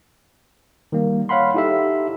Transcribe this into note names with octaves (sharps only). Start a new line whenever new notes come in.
D#3 G3 A#3
C#5 F5 F#5 B5 C6
D#4 E4 G4 A4 E5